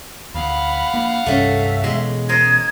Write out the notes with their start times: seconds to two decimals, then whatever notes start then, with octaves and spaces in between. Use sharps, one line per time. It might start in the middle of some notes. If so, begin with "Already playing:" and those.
0.34 D2 F5 F#5 B5
0.94 A#3 D4
1.26 C2 G2 A3 C#4 E5
1.84 B2 E3 G#3
2.29 A#4 C5 D#5 G#6